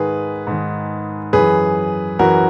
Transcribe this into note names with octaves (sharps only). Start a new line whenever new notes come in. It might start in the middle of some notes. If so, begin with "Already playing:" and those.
Already playing: G#2 D#3 G#4 B4
G#2 D#3
F#2 E3 G#4 B4
F#2 E3 F#4 A#4